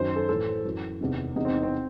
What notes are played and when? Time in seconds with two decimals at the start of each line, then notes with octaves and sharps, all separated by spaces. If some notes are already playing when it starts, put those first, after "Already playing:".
Already playing: F#2 D#3 C5
0.16 A4
0.29 A2 E3 A4
0.65 F#2 E3
1.01 E2 C3 D#3
1.36 E2 C3 E3 D#4
1.45 C4
1.54 D#4
1.63 C4